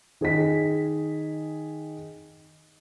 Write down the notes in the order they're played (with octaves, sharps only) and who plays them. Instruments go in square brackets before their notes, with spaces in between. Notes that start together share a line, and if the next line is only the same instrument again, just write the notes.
[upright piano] D#3 G#4 D#5 B6